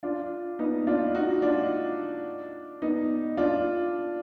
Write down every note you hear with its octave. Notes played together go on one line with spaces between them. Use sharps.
D4 F4
B3 D#4
D4 F4
D#4 F#4
D4 F4
B3 D#4
D4 F4